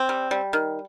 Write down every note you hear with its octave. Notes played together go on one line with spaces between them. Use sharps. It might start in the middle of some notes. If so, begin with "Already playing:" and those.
Already playing: C4
G3
G3
D#3